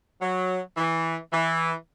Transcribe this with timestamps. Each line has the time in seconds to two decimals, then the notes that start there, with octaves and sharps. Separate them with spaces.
0.20 F#3
0.77 E3
1.33 E3